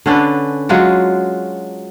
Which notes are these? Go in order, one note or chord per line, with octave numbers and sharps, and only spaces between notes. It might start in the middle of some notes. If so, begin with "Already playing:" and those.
D3 C#4 D4 B4
F#3 G#3 F4 F#4